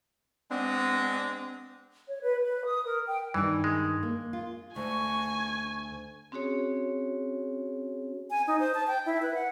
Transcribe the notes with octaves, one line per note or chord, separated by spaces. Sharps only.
G#3 B3 C4 D4
C#5
B4
B4
D#6
A#4
G5
G2 D#3 E3 D#4
G#3
A#3
F4
D2 G#5 C#6
C4 C#4 F#4 G#4 C#5
G#5
D#4
C5
A5
G5
E4
B4
F#5